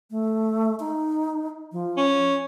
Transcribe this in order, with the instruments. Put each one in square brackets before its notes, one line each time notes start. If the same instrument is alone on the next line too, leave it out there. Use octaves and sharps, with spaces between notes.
[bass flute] A3
D#4
F3
[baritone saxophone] C#4